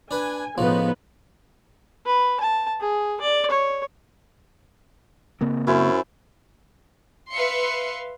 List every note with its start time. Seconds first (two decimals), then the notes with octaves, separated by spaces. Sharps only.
0.11 D4 B4 G#5
0.58 C#2 A2 F3 B3 D#4 B4
2.06 B4
2.40 A5
2.81 G#4
3.21 D5
3.50 C#5
5.41 C#3 A#3 C4
5.67 F#2 C#4 E4 C5
7.32 B4 E5 F5 C6 C#7